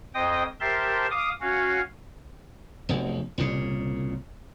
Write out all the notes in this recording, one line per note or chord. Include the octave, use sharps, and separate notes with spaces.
F2 C5 D#5 G5 D#6
G4 A#4 C5 E5 A5 C6
F5 D6 D#6
C#4 F#4 F5
F1 B1
C2 A#2 C#3